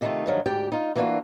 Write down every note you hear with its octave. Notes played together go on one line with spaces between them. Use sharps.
C3 D#3 A3 C#4 D#4 F4
G2 D3 D#3 F3 F#3
D2 G#2 G4 D5 G5
D#4 F4
E3 A#3 B3 D4 F4 F#4